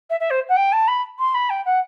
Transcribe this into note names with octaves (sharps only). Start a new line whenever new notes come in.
E5
E5
C5
F#5
G5
A5
B5
C6
B5
G5
F#5